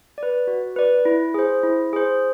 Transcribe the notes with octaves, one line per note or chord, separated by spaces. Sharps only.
B4 D5
F#4
B4 D5
E4
G#4 C5
E4
G#4 C5